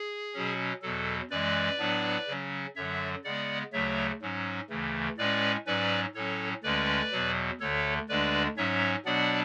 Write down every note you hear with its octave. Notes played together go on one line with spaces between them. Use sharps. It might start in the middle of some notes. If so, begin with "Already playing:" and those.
Already playing: G#4
B2 F#3 C#4
E2 B2 F#3 A4
F#2 E3 G#3 B4 D5
A2 F#3 B3 D4
C#3 F#3 C#4
F#2 D3 F#3 C#5 E5
C#3 G#3 B3 D5 F#5
D2 C#3 F#3 A3 C#5 E5
G#2 F#3 C#4
D2 C#3 E3 A3
A2 G#3 C#4 B4 D5
G#2 F#3 C#4 B4 D5
A2 F#3 C#4 A4 C#5
D2 D3 G#3 C#4 B4 D5
E2 B2 F#3
D2 D3 A3 A4 C#5
D2 D3 G#3 D4 B4 D5
G#2 F#3 C#4 C#5 E5
B2 F#3 B3 D4 D5 F#5